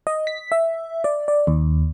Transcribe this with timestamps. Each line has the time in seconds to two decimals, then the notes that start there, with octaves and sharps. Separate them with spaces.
0.07 D#5
0.27 B6
0.52 E5
1.04 D5
1.28 D5
1.47 D#2